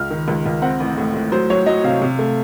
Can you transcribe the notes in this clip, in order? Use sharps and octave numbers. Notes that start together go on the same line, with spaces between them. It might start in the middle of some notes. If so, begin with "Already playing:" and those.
Already playing: C#2 F6
D#3
C#2
C#2
C4 F#5
A1
A2
A2
F#3 C5
F#3 C#5
F#3 D#5
C3 F5
C3
A3